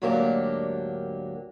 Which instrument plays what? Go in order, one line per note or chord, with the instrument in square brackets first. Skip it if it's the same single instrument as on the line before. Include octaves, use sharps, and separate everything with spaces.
[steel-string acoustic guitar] D2 G#2 F#3 A#3 D4 G4